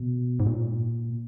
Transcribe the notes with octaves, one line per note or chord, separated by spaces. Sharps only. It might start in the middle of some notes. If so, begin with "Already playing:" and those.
Already playing: B2
G#2
A#2